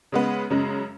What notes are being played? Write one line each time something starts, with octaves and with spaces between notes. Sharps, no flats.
C#3 G#3 B3
F#2 C#3 G#3